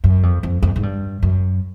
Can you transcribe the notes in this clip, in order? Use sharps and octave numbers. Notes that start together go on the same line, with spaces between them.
F#2
F2
F2
F2
G#2
G2
F#2